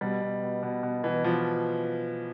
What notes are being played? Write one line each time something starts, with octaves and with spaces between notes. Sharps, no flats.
B2 G3
B2
B2
B2
B2
B2 E3
B2 F3